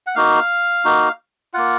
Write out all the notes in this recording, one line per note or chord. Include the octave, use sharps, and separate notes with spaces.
F#5
A#3 D#4 F#4 F5
A#3 D#4 F#4
A#3 F4 F#5